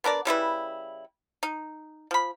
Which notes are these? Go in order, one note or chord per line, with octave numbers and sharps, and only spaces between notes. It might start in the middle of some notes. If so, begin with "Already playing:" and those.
B3 D4 A#4 D5
C#3 G3 E4 B4
D#4
F3 B5